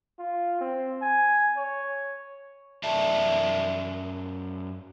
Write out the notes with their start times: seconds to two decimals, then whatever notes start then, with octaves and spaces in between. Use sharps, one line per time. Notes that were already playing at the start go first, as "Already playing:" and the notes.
0.19 F4
0.61 C4
1.02 G#5
1.57 C#5
2.83 F#2 D5 E5 A5